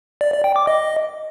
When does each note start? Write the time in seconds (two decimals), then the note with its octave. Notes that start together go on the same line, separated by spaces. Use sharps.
0.21 D5
0.33 D5
0.44 G5
0.56 D6
0.67 D#5